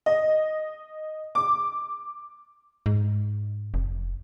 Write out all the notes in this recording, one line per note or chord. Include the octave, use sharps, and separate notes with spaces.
D#5
D6
G#2
F1